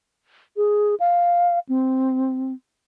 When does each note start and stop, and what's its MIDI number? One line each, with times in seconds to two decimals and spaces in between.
0.57 0.95 68
1.00 1.59 77
1.69 2.53 60